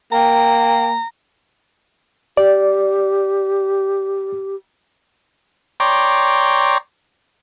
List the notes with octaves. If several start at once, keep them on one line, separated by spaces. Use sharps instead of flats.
A#3 G5 A#5
G4 D5
C#5 D5 G5 A#5 C6